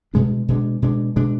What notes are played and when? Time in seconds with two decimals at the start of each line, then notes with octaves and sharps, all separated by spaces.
0.14 B2 G#3 D4
0.48 B2 G#3 D4
0.82 B2 G#3 D4
1.16 B2 G#3 D4